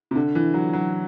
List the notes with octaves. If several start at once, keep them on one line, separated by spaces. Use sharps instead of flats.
C3
D3
E3
F#3
F#3